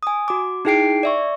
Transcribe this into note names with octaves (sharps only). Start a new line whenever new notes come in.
G#5 D#6
F#4 D6
D#4 E4 G#4 G5 C7 D7
D5 E5 C#6